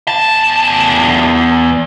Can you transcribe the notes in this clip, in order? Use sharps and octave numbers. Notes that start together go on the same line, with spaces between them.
E2 A5